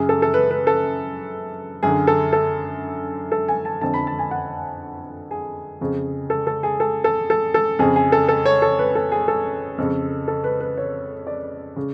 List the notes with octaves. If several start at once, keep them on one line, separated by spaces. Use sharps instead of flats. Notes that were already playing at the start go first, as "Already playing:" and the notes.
Already playing: F#2 C#3 G#4
A4
A4
B4
B4
A4
F#2 D3 G#4
A4
A4
A4
G#5
A5
F2 D3 A5
B5
A5
G#5
F#5
G#4
F2 C#3
A4
A4
G#4
A4
A4
A4
A4
F2 C#3 G#4
G#4
A4
A4
C#5
A4
B4
A4
G#4
A4
F2 C#3
A4
B4
B4
C#5
D5
C#3